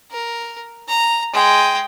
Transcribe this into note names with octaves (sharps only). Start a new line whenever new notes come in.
A#4
A#5
G#3 G5